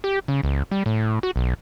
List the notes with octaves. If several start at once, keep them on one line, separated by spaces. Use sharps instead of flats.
G4
C#3
C#2
G3
A2
F#4
B1